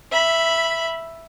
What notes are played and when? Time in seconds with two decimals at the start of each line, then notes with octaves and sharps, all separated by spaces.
0.11 E5 B5